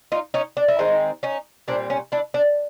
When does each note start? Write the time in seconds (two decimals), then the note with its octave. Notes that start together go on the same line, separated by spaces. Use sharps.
0.12 D#4 F4
0.34 C#4 D#4
0.57 D4
0.68 E4
0.79 D#3 G#3 C4 D#4
1.23 C#4 D#4
1.68 A#2 G3 C4 D4
1.90 C#4
2.12 D4 E4
2.34 D4